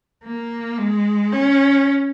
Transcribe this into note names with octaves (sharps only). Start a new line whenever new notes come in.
A#3
G#3
C#4